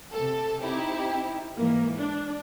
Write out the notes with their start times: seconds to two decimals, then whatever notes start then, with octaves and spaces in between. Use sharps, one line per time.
0.12 C3 A4
0.61 C4 D#4 E4 G4
1.56 G#2 E3 A#3
1.97 D4